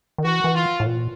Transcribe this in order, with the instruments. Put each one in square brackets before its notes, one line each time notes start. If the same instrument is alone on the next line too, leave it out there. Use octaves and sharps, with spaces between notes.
[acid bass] D#3
[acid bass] E3 [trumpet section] F#4
[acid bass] E3
[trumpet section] F4
[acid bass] A2
A#2